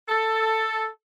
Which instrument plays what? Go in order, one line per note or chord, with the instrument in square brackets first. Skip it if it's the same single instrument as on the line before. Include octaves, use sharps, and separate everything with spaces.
[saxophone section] A4